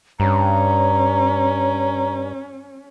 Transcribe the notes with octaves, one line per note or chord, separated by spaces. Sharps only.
G2 C#4 A#5